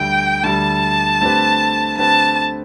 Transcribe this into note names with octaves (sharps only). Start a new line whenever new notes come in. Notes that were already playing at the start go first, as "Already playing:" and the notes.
Already playing: D2 D3 G3 G5
D2 D3 G3 A5
D3 A3 C4 G4 B4
D3 A3 C4 G4 B4 A5